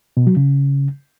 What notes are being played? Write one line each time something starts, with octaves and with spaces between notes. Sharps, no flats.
B2
F#3
C#3